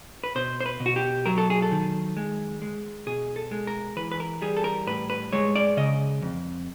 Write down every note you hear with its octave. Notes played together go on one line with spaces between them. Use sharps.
B4
B2 C5
C5
B4
B2
F#4
G4
F#3 A#4
A4
G#4
A4
D#3
G#3
G#3
B2 G#4
A4
G#3
A#4
E3 B4
B4
A#4
G3 G#4
A4
A#4
A2 B4
B4
G#3 C#5
D5
C#3 D#5
F2